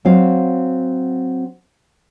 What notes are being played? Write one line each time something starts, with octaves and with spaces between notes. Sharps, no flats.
F#3 C4 F5